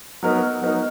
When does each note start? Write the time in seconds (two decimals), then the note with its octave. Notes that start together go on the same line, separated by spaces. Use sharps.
0.23 F#3 B3 D#4 A#4
0.62 F#3 B3 D#4 A#4